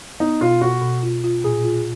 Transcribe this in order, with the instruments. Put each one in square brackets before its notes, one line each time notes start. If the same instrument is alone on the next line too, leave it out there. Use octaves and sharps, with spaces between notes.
[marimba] B3 [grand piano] D#4
[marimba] B2 [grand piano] F4
[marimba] B2 [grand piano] F#4
[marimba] B2
F4
F4
[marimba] A#2 [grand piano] G#4
[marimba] F4